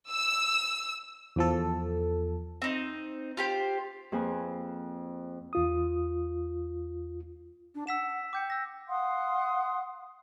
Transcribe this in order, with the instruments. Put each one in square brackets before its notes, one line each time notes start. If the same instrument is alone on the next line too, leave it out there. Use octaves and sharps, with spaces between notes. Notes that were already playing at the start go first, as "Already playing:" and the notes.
[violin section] E6
[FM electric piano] E2 F3 A4
[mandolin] C4 D#4
F4 G4 C5
[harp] F2 A#3 G#4 B4 C5 G#5
[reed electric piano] E2 F4 D#6
[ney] D4
[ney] F#5 [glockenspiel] E6 B6 E7
[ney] G5 [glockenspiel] D6 G6 C#7
[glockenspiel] E6 A#6
[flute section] F5 F#5 C6 D#6